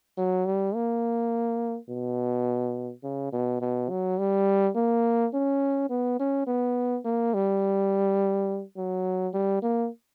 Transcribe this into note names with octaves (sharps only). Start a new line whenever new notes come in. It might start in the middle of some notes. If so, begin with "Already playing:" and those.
F#3
G3
A#3
B2
C#3
B2
B2
F#3
G3
A#3
C#4
B3
C#4
B3
A#3
G3
F#3
G3
A#3